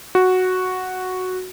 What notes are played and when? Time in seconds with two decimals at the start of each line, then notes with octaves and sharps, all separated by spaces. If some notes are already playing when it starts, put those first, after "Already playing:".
0.15 F#4